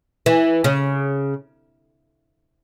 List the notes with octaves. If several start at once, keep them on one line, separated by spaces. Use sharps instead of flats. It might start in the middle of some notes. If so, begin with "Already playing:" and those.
E3
C#3